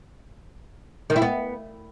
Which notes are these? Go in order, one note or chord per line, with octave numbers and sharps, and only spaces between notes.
D#3
E4
B3